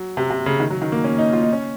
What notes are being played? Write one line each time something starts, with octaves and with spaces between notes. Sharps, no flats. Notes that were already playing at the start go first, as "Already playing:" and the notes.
Already playing: F#3
C3
C3
C#3
D#3
F#3
D#3
A#3
C#4
D#4
F4
D#4
C#4